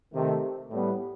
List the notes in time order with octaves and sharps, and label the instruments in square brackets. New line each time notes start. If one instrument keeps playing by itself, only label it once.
[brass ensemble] C3 D#3 A3
A2 G3 B3